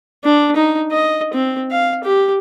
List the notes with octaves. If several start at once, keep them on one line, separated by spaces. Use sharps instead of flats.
D4
D#4
D#5
C4
F5
G4